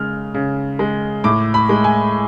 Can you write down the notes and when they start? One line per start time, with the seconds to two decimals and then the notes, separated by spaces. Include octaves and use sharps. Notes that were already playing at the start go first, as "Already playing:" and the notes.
Already playing: C#3 G#3 F6
0.34 C#3
0.79 G#3
1.24 A2 D6
1.54 B5
1.69 G#3
1.84 G#5